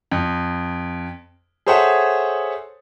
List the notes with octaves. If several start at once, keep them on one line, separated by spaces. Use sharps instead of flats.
F2
G#4 A4 C5 C#5 E5 F#5